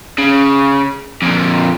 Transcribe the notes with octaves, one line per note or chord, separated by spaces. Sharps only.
C#3
F2 A#2